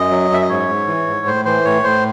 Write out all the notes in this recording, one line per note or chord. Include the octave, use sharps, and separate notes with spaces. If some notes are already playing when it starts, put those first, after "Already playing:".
Already playing: F#2 D#5
F#3
F#2 E5
D#5
G#2 C#5
G#2
E3
G#2
A2 C5
E3 C5
A2 C#5
A2 C5